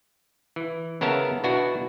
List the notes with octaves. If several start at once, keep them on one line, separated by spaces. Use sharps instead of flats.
E3
C#3 B3 C#4 A#4 E5 A5
B2 B3 D4 E4 F#4